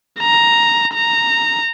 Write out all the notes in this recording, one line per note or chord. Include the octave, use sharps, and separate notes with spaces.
A#5
A#5